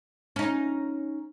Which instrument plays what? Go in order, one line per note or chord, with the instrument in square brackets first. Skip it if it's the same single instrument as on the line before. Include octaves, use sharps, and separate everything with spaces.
[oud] C#4 D#4